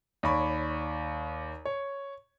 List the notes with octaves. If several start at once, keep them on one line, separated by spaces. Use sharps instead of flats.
D#2 C#5 D5 B5 C#6
C#5